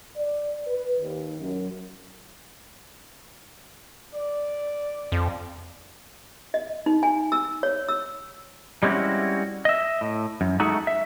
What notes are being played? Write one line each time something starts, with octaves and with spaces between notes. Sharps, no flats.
D5
B4
D#2
F#2
D5
F2
D#5
D#4
G#5
E6
C#5
E6
G3 G#3 C4 C#4 E4 F#4
D#5 E5
A2
F#2
G#3 A3 D#4 F#4 G#4 A4
E5